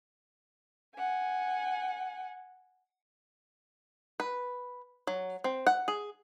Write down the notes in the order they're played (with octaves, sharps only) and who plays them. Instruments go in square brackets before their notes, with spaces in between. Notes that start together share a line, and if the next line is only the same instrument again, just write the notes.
[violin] F#5 G#5
[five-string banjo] B4
F#3
C4
F#5
G#4